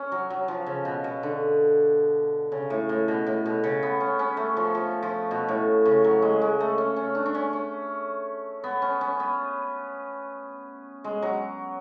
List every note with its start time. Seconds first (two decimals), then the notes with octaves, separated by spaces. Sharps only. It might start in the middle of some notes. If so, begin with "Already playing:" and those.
Already playing: C#4
0.12 F#3
0.30 F#3
0.48 F3
0.66 C#3
0.85 B2
1.04 B2
1.23 D3
2.52 C#3
2.70 A2
2.89 A2
3.08 B2
3.26 A2
3.46 B2
3.64 C#3
3.83 B3
4.00 C#4
4.19 C#4
4.37 A3
4.57 F3
4.75 F3
5.03 F3
5.31 B2
5.48 A2
5.85 C#3
6.04 F#3
6.22 G#3
6.42 G#3
6.60 A3
6.78 C#4
6.96 C#4
7.15 D4
7.26 D4
7.35 C#4
7.53 C#4
8.64 B3
8.82 C#4
9.01 C#4
9.20 B3
11.04 G#3
11.22 F#3